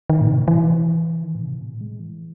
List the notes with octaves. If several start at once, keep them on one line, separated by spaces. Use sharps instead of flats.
D#3
A2
C3
E3
D#3
A2
C3
A2
G#3
E3